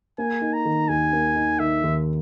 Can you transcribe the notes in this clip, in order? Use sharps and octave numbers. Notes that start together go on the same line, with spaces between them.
A#3 G#5
D#4
A#5
D#3
D#2 G#5
A#3
D#4
D#3 E5
D#2